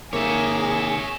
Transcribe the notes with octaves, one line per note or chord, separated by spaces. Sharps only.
C3 D#3 A#3 C4 G#4 C#5 E5